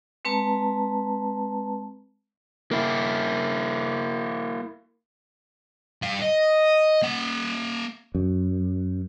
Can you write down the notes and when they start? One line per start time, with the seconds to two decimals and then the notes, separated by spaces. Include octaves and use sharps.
0.25 G#3 C4 B4 A5 A#5
2.71 A#3 E4
6.02 G2 F5
6.22 D#5
7.02 A#3 F#5
8.15 F#2